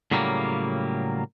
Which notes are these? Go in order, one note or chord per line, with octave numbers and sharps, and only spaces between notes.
A2 C#3 F#3 G3 A3 A#3